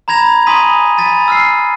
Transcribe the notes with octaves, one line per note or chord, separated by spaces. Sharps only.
A#5 B5 G#6 A#6 F7
G#5 B5 C6 D#6 B6 D#7
G#5 B5 A6 B6 D#7
E6 F6 C7